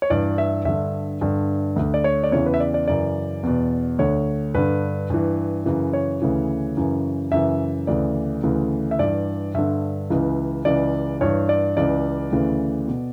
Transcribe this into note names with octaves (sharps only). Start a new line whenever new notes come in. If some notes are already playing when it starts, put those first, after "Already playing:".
C#5
G2 E3 D5
E5
G2 D3 E5
G2 D3
D2 D3
D5
C#5
D5
E2 C#3 E3 C#5
B4
E5
D5
D5
F#2 C#3 E3 D5
E2 B2
D2 D3 C#5
G2 D3 B4
G2 E3
F#2 C#3 E3
C#5
D2 C#3 E3
F#2 C#3 E3
F#2 C#3 E3 E5
D2 C#3 E3 D5
D2 C#3 E3
E5
G2 E3 D5
G2 D3 E5
C#2 C#3 E3
C#2 C#3 E3 D5
G2 E3 C#5
D5
C#2 C#3 E3 D5
D2 C#3 E3
B2